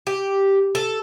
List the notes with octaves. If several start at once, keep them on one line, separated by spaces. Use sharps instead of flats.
G4
A4